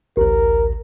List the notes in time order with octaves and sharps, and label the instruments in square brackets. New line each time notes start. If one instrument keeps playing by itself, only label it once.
[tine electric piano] A1 D2 [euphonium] A#4